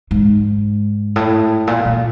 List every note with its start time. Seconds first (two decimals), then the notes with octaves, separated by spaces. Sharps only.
0.11 G#2
1.16 A2
1.67 A#2
1.85 A#2